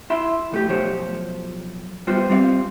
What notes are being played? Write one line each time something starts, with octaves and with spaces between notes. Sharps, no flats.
E4 E5 B5 C6
F2 A3 G4
B1 F3 G4 C5 C#5
G3 B3 F4 B4 C5
G3 C4 C#5 F5